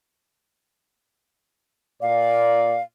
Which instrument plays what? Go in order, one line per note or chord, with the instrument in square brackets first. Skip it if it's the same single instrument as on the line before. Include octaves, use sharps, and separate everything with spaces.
[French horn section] A#2 D5 [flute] F5